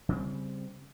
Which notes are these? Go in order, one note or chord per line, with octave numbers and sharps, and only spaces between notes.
C#3 G3 A3 C4